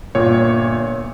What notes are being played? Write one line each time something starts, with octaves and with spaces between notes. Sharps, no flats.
G1 A#2 C#5